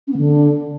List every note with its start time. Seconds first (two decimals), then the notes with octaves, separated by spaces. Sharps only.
0.07 C#4
0.12 B3
0.17 D3